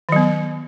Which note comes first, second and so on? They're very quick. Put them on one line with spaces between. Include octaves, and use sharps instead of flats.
D#3 F#3 B3